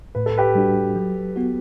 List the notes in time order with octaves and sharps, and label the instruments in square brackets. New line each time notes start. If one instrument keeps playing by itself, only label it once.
[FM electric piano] A2 [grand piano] B4
[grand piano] A4
G4 B4
[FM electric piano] G3 D4 F#4
F#3
B3 F#4